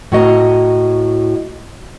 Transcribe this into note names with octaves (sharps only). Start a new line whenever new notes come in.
A2 F#4 D#5 A#5